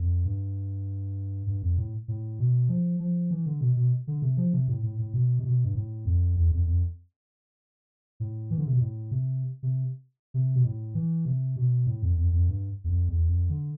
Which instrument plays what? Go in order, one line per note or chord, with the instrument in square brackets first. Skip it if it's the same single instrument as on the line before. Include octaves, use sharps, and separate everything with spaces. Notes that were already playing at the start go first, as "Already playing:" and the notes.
Already playing: [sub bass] F2
G2
G2
F2
A2
A2
B2
F3
F3
E3
D3
B2
B2
D3
C3
F3
C3
A2
A2
A2
B2
C3
B2
G2
A2
F2
E2
F2
F2
A2
E3
D3
C3
B2
A2
C3
C3
C3
B2
A2
E3
C3
B2
A2
F2
F2
F2
G2
E2
F2
E2
F2
D3